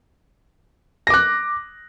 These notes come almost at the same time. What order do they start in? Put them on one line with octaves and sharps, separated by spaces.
A#6 D6 F#6